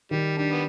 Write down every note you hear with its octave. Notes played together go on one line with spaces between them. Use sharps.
D#3 G3
G3 D4
B3